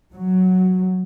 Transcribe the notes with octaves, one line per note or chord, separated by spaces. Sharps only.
F#3